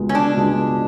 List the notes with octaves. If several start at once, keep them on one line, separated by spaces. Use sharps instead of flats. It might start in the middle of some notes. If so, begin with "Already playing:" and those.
Already playing: C#2 B2 G#3
C#4
D4
C#2 B2 G#3